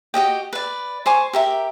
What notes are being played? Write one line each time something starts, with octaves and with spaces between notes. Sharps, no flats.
F#4 G4 D#5 G5
B4 D5
C5 G#5 C#6 D6
G4 A#4 E5